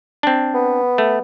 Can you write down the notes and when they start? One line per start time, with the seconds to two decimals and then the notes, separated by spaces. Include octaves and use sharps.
0.23 C4 D4
0.54 B3
0.98 A3